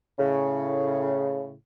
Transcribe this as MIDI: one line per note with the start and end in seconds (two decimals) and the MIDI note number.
0.19 1.53 45
0.19 1.53 49